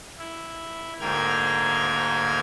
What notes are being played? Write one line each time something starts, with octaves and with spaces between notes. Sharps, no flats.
E4
D2 G#2 A#3 G5 F6 G#6